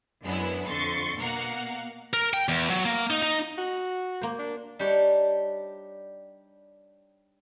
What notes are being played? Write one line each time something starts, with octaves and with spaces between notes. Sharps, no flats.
F#2 F#3 G#3 B3 D4 E4
F2 D3 C6 C#6 A6 C#7
B2 A#3 A#4 F5 F#5 C#7
A#4
G5
E2
F#3
A#3
D#4
D#4
F#4
A#3 C5
D4
G3 D4 D#4 G4 C#5